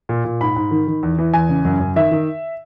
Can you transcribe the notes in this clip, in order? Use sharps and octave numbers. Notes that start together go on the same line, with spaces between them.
A#2
A#2
G#2 B5
G#2
D#3
D#3
E2
E3
E2 G#5
C#3
F#2
F#2
D#3 E5
D#3